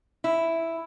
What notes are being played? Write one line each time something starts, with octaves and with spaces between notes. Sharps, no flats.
E4